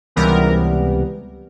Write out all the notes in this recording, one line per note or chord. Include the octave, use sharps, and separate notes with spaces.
C#2 C3 E3 G3 B3 A#4